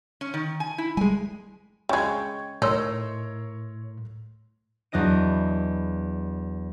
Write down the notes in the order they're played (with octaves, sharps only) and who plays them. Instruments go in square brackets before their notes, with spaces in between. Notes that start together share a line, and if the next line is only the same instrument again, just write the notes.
[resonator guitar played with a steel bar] C#4
D#3
G#5
E4
[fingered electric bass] G3 G#3 [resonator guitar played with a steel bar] G#5
[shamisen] C#3 G#3 [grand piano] G5 C#6 G#6
[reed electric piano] A2 [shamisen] D#4 [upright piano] A#4 C#5 [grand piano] C6 E6
[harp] E2 F#3 D4 D#5 D#7